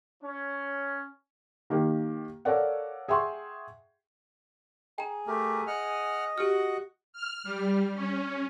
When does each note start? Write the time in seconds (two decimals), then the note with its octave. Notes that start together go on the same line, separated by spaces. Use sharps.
0.23 C#4
1.70 D#3 A#3 G4
2.45 A4 A#4 C#5 D5 F5 F#5
3.08 G#4 E5 F#5 G5 C6 C#6
4.98 G#4 G5 A#5
5.27 A3 G4 A#4
5.67 D#5 F#5 F6
6.38 F#4 G4 F#5 F6
7.13 F6
7.44 G3
7.94 C#4